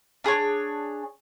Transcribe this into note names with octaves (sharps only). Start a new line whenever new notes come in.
D4 G#4 C5 C#5